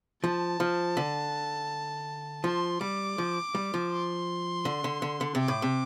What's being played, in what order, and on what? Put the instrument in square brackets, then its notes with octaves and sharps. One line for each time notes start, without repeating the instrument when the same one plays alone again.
[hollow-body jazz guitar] F3 [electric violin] A5
[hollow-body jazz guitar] F3
D3
[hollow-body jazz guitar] F3 [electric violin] C6
[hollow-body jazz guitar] G3 [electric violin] D6
[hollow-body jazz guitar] F3
G3
F3
[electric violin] C6
[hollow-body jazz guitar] D3
D3
D3
D3
[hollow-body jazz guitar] C3 [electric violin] D6
[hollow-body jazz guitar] A2
C3